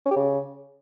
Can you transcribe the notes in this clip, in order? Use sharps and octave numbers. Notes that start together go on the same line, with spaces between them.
C#4
G4
C#3